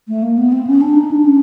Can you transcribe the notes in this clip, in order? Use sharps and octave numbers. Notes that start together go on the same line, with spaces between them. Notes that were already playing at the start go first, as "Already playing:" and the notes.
A3
A#3
B3
C4
C#4
D4
D#4
D4
C#4